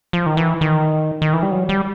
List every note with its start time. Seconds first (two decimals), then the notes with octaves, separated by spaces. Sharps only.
0.13 F3
0.26 D#3
0.37 E3
0.61 D#3
1.22 D#3
1.33 E3
1.43 G3
1.51 F#3
1.69 G3